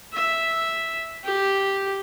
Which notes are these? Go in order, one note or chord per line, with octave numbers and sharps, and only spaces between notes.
E5
G4